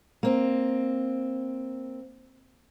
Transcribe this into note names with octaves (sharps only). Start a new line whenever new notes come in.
A#3 C4